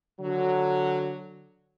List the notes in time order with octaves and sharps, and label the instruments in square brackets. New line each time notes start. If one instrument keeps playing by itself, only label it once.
[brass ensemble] D3 F#3